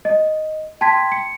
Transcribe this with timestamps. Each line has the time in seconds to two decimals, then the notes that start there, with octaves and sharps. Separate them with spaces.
0.05 D#5
0.81 G5 A5 C6 G#6 B6
1.12 C#7